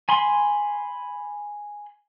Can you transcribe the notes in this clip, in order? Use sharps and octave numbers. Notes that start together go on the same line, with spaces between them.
G#5 B5 C6